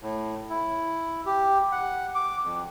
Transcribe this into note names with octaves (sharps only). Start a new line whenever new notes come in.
A2
E4
G4
F#5
D6
F2